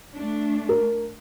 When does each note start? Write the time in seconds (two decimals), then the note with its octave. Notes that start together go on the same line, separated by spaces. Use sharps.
0.16 A3 D4
0.69 A#4